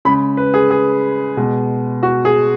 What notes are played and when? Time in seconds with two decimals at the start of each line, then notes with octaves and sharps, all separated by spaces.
0.05 C#3 G#3 B5
0.37 B4
0.54 G#4
0.71 G#4
1.37 B2 G#3
2.03 F#4
2.25 G#4